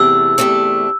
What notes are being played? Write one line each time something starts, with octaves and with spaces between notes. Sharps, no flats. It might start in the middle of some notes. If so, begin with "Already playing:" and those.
Already playing: E2 C3 A3 D4 E6
E2 C3 A3 D4